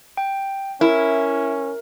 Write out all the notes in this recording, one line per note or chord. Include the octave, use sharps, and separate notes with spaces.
G5
C#4 E4 A#4